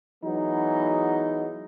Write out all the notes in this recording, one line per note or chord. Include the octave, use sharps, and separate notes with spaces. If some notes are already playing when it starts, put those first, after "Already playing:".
E3 F#3 G#3 B3 D#4